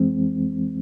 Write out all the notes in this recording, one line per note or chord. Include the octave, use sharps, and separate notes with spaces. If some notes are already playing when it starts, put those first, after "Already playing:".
Already playing: F2 E3 G#3 C4